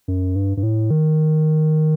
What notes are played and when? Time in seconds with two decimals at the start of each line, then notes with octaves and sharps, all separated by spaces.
0.08 F#2
0.36 G2
0.57 G2
0.63 A2
0.90 D#3